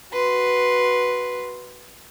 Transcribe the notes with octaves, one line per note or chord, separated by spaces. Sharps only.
F#4 B4 C6